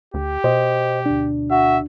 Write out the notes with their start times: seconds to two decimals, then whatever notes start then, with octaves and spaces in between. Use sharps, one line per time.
0.14 D2 G4
0.44 B2 C5 D#5
1.06 D2 D4
1.50 F#4 E5